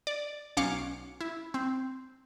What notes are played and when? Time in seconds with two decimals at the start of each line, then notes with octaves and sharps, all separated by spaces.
0.07 D5
0.57 B1 C#4 F5 D6 C#7
1.21 E4
1.54 C4